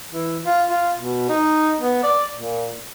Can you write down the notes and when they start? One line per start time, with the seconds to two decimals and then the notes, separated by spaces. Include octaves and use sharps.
0.12 E3
0.44 F4
0.70 F4
0.98 B2
1.29 D#4
1.77 B3
2.03 D5
2.35 A#2